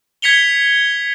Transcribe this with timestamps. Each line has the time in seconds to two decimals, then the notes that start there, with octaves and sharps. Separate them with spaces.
0.22 G#6 B6 C#7 F7 G7